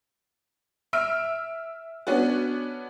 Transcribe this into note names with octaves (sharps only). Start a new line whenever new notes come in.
E5 E6 F6 D7
B3 C#4 D4 F#4